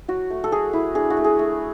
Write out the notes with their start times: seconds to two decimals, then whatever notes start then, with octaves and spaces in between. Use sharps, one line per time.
0.08 F#3 F#4
0.30 A3
0.44 A4
0.52 F#3 G#4
0.73 E4
0.95 D4 G#4
1.10 F#4
1.17 A3
1.24 G#4
1.39 A3